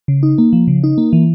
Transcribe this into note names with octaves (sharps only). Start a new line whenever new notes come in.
C#3
D#4
A#3
F3
C#3
D#4
A#3
E3